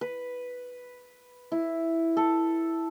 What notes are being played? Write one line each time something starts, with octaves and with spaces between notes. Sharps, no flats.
B4
E4
A4